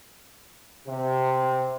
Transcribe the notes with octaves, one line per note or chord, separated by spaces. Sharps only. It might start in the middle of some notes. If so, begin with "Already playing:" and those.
C3